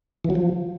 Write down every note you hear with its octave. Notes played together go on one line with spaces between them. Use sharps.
E3
F#3
F3